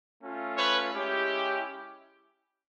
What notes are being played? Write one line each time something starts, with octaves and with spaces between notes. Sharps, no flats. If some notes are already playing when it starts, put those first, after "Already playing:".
A3 C#4 F4
B4 C#5
G#3 C#4 E4 G4